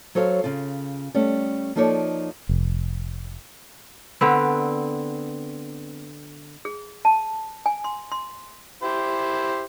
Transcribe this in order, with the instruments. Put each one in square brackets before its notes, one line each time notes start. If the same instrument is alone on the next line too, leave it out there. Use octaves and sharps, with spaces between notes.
[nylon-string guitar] F#3 A4 C5 C#5 F5
C#3 F4
G3 A3 C#4
F3 A#3 D#4 A4 C#5 D5
[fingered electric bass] F1
[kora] D3 B3 C4
[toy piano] G#4
A5
G#5
C6
C6
[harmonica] E4 G4 C5